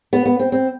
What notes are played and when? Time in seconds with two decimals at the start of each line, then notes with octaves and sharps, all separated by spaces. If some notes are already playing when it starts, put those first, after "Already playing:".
0.13 B3
0.25 B3
0.39 C4
0.52 C4